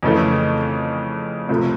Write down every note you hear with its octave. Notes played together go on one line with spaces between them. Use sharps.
F2 C#3 E3 A3 C#4
C#2 C3 F3 A3